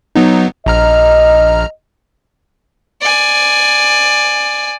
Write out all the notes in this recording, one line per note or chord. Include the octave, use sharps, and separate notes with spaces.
F#3 B3 D#4
A#1 D#5 A#5 F6
D5 G#5